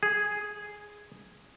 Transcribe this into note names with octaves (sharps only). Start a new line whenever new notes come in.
G#4